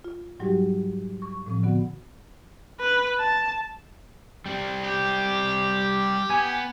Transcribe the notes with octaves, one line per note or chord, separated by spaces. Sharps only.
F4
G#2 F#3 G3 D#4 F#4 G4
C#6
A2 F3 C4
D3 B3 F#4 F#5
B4
A5
G3 C4
G4
B3 G#5